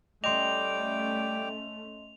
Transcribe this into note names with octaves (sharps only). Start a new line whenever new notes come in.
G3 A3 C#4 D#5 G5 C6 D6 F7